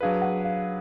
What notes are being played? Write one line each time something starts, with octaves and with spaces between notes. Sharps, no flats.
F#3 D4 G#4 B4 F5
F#5
F5